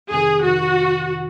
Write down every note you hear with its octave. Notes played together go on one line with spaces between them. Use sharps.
F2 C3 D#3 G#4
F2 C3 D#3 F#4